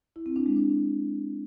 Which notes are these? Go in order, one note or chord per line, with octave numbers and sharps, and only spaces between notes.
E4
C4
D4
G#3
D4